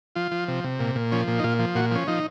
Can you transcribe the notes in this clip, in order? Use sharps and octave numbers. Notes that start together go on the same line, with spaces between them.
F3 F4
F3
C3
C3
A#2
A#2
F3 C#4
A#2
D#4
A#2 F4
F3
A#2 F#4
F3 C#4
F3 D#4